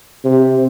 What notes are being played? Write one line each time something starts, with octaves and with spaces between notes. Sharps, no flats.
C3